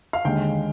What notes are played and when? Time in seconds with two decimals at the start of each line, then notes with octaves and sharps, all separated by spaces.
0.13 F5
0.25 D#2 D3 G#3 G5